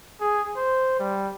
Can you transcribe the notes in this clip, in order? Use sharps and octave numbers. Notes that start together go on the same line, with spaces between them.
G#4
C5
G3